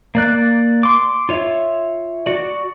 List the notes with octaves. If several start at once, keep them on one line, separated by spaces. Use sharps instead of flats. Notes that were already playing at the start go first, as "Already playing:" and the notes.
A#3 D5 F#6
C6 D6
F4 C#5 E5
F#4 D5